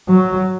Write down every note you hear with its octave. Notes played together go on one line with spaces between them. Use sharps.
F#3